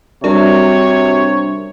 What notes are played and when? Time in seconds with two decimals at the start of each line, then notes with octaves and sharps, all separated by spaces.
0.24 C3 G3 D4 F#4 A#4 C#5